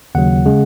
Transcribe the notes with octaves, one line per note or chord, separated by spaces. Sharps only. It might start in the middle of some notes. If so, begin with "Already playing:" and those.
D#2 C#3 F#3 F#5
C#3 G#3